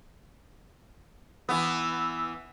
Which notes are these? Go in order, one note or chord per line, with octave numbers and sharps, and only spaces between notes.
E3 B3 E6